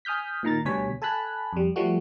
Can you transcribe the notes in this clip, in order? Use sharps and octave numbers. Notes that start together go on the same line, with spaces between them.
G#5 D#6 F6 G6 B6
A#2 D#3 A#5 A6
D2 B2 G3 C#5 G#5 B6
A4 G#5 A5 B5 F#6 B6
F2 G3
F3 G3 A3 F#4